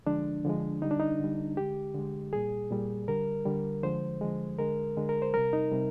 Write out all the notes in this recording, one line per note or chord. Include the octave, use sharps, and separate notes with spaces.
D3 F3 G#3 D4
D3 F3 G#3
D3 G3 D#4
D4
D#4
D3 G3
D3 G#3 G4
D3 G#3
A#2 G3 G#4
A#2 G3
D3 G3 A#4
D3 G3
D3 F3 G#3 C5
D3 F3 G#3
D3 G#3 A#4
D3 G#3
A#4
C5
C3 G3 A#4
D#4
C3 G3